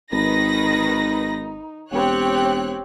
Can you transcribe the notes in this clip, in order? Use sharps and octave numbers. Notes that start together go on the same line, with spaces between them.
G#1 D#3 D#4 B4 A#6
E1 C4 G4 C#5 F#6